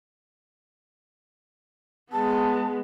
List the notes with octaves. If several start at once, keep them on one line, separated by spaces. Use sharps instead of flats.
G#3 B3 A5